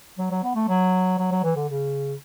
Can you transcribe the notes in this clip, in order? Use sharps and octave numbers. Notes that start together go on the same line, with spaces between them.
F#3
F#3
B3
A3
F#3
F#3
F#3
E3
D3
C#3